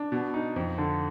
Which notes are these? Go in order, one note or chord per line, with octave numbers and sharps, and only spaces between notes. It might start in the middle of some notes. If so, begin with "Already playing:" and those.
Already playing: D4
B2
D#4
F2
D3